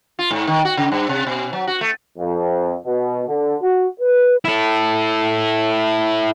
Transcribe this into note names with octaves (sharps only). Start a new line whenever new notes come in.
F4
G#2
D#3
F#4
C#3
G2
C3
B2
F#3
F#4
A3
F2
B2
D3
F#4
B4
E4 A4